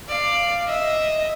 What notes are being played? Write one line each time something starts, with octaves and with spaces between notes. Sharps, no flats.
D5 F5
D#5 E5